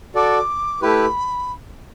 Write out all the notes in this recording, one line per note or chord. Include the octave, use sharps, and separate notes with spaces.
F#4 A4 D5 D6
A3 E4 G4 B4 B5